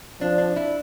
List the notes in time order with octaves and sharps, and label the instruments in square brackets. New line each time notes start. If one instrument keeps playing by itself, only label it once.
[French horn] F3 [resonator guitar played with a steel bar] D4
[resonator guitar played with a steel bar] D4
E4